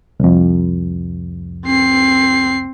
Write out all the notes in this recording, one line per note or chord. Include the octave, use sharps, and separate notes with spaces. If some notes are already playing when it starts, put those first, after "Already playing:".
C2 F2
C4 C7